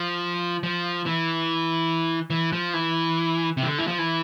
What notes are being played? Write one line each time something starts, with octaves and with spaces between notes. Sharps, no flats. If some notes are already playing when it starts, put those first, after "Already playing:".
Already playing: F3
F3
E3
E3
F3
E3
C3
E3
D3
E3
F3
E3